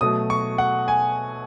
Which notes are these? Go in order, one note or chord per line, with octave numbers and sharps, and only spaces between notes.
B2 F#3 A3 D#6
C#6
F#5
G#5